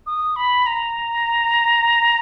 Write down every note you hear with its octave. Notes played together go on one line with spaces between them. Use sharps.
D#6
B5
A#5